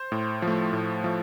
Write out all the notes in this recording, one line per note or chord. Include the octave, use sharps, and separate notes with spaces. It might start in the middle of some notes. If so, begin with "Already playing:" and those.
Already playing: C5
A2
F3
A3
A2
F3 A3